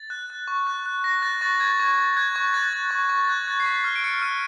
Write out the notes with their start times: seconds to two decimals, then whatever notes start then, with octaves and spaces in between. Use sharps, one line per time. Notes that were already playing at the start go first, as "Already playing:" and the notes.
Already playing: A6
0.10 F#6
0.30 F#6
0.48 C#6
0.67 F#6
0.86 F#6
1.04 F#6 A#6
1.22 F#6 A6
1.41 C#6 A6
1.60 C#6 G#6
1.80 C#6
1.98 C#6
2.16 F#6 G#6
2.35 C#6 G#6
2.53 F#6 A6
2.73 F#6
2.91 C#6
3.09 C#6
3.24 A6
3.29 F#6 G#6
3.47 F#6 A6
3.60 C7
3.66 C#6 B6
3.84 F6 C7
3.96 D7
4.04 F6 C#7
4.22 F6 D#7